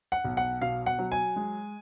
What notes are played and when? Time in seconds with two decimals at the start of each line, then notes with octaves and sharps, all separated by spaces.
0.12 F#5
0.25 B1
0.37 F#5
0.62 B2 F5
0.86 F#5
0.99 F#3
1.12 G#5
1.36 G#3